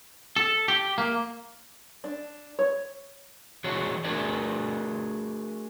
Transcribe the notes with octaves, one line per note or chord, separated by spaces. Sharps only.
A4
G4
A#3
D4
C#5
E3 D4 F#4 G#4 C#5
A3 D4 F#4 G#4 A#4 D5